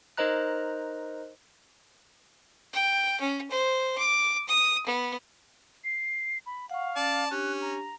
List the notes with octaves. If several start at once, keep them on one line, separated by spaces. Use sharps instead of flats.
D#4 A#4 C5 D#5 A#5 F#6
G5
C#4
C5
D6
D#6
B3
C7
B5
F5 F#5 C#6
C#4 D5 A5
C#4 D4 G4 F#6
A#5